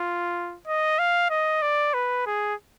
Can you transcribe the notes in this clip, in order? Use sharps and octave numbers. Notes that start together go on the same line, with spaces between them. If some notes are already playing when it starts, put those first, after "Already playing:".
Already playing: F4
D#5
F5
D#5
D5
B4
G#4